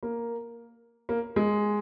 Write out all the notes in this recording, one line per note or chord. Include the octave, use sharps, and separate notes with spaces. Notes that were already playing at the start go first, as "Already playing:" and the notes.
A#3
A#3
G#3